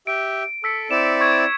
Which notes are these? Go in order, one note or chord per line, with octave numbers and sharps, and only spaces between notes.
G4 E5 D7
A4 E6 B6 C#7
C4 E4 D5 E7
C#6 G#6